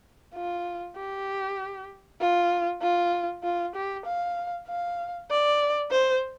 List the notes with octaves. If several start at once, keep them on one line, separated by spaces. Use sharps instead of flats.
F4
G4
F4
F4
F4
G4
F5
F5
D5
C5